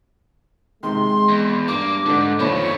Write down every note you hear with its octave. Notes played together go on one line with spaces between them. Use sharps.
C3 D#3 G#3 C6
E2
G2 A#3 D6
F2 G#2 D3 D4
A#2 D#3 F3 A3 D4 C#5 B5